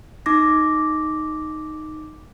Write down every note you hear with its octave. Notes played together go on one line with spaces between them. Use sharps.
D#4 D6 A#6